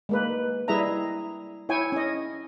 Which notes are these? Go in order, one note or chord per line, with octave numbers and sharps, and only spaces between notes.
G#3 A#3 B4
G3 E4 G#4 D#5 E5 A#5
E4 C#5 G5 G#5
C#4 D#5